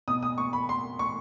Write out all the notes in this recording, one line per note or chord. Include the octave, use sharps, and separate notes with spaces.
B2 D#6
D#6
C#6
B5
C6
C#6